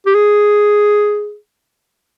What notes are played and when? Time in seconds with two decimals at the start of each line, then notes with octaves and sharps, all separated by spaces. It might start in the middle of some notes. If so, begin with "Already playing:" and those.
0.06 G4
0.15 G#4